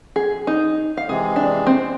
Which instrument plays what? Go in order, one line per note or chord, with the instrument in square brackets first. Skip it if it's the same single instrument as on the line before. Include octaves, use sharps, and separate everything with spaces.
[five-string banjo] G#4
D#4
F5
[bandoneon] C3 E3 G#3 [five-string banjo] G#4
[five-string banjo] D4
C4